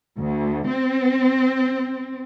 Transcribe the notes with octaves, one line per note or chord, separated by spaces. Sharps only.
D2
C4